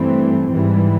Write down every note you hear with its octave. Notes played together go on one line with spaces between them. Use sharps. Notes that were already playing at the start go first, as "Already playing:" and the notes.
Already playing: G2 E3 A3 C4
G#2 E3 G3